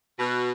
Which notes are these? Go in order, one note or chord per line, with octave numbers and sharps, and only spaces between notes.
B2